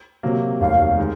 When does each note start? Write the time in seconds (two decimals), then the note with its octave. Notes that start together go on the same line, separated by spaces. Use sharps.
0.23 C3 F#3 A#3
0.60 F1 D#2 D#3 F5
0.98 D#3 G#3